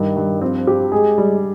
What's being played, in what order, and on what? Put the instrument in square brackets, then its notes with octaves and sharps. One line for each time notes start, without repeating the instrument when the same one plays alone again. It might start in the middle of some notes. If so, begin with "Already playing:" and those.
Already playing: [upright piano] G2 [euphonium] D#3
[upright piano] G2
[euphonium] F3 [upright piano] C4
[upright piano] G4
[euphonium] G#3 [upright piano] G#4
[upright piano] G3